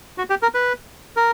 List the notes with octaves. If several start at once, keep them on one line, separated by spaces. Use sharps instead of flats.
F#4
G4
A#4
B4
A#4